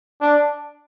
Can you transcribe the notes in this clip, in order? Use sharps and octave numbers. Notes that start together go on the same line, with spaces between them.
D4